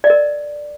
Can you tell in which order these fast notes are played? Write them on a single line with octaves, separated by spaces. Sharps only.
D5 D#5 A#4